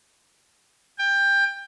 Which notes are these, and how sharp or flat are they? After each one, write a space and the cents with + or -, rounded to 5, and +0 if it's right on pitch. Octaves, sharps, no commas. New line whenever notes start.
G5 +20